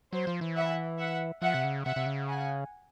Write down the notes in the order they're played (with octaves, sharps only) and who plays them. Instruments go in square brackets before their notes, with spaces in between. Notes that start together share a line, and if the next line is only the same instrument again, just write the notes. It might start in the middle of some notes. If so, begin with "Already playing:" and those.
[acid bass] F#3 [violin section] C5
[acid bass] F3
E3
[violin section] E5 F#5
E5 F#5
[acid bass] F3 [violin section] E5 F#5
[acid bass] C3
C#3
[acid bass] C3 [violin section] E5 F#5
[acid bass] C3
C#3
[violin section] F#5 G#5